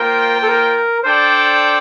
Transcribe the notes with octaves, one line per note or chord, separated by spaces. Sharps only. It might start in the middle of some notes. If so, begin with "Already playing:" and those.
Already playing: A#3 F4 A#4 C5 G5
A4
A#4
D4 A4 C5 D5 G5